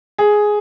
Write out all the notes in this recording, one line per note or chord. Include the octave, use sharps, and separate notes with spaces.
G#4